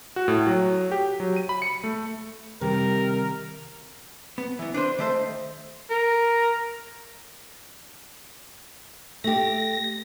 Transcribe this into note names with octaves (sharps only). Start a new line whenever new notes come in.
F#4
A2
F#3
G4
F#3
D#7
B5
C#7
A3
C3 D#3 G3 A#4
B3
E3 B3
D4 B4 C5
D#3 A3 C5
A#4
A3 G4 A#6